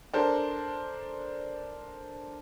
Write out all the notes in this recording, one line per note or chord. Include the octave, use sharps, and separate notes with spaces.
D4 A4 A#4 C5